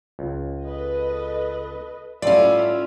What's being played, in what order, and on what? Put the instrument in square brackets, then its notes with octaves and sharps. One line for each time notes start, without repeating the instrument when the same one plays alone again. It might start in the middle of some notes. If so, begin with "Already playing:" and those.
[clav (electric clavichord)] C#2
[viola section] A4 B4 D#5
[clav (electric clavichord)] A2 G3 [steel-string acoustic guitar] C#4 F4 [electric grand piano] D5 [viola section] E5